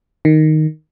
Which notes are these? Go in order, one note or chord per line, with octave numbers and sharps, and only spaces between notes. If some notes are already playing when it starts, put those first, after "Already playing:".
D#3